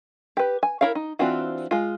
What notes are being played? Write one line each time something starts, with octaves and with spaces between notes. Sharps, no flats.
G4 B4
G#5
E4 A#4 C#5 F5
D#4
E3 C4 D4 F4 F#4
G#3 F4